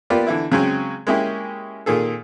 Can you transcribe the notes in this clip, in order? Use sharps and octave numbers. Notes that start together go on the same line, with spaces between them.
A#3 B3 F4 G4 D5
D3 E3 E4
C#3 F#3 G#3 C4 C#4
G#3 A#3 C#4 E4 G4 G#4
A#2 D#3 G#4 A4